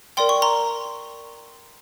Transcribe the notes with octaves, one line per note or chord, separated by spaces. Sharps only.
A#4 D5 G5 C6
C#6
A#5 C6